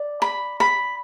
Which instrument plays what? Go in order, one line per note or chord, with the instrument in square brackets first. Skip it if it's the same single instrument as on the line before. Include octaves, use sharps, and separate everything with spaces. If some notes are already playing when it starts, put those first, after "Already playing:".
Already playing: [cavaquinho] D5
B5
B5